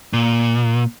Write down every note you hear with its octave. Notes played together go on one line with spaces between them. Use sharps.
A#2